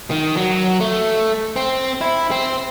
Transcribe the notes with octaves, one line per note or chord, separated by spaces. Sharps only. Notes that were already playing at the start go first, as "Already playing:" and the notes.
D#3
F#3
A3
C4
E4
C4